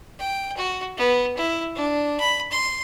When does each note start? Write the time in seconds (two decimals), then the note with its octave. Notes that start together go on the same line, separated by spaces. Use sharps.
0.19 G5
0.57 F#4
0.97 B3
1.37 E4
1.75 D4
2.20 B5
2.51 C6